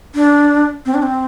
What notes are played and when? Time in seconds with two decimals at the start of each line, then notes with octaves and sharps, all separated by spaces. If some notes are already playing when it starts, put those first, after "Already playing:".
0.15 D4
0.86 C4
0.94 D4
1.03 C4